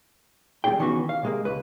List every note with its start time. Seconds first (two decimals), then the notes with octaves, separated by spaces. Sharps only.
0.64 D#2 G3 D4 E4 G#4 G5
0.79 C#2 D#3 E3 B3 C#4 F#4
1.09 F5
1.23 C3 G#3 A#3
1.45 C#2 B4